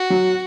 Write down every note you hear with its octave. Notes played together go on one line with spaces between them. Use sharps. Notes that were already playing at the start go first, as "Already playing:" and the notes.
Already playing: F#4
F#3